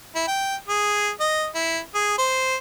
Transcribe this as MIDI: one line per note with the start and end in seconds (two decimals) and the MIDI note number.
0.15 0.24 64
0.28 0.56 79
0.68 1.10 68
1.20 1.47 75
1.55 1.79 64
1.95 2.15 68
2.18 2.56 72